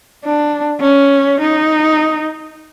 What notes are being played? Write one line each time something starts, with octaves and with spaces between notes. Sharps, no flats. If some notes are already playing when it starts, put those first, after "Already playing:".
D4
C#4
D#4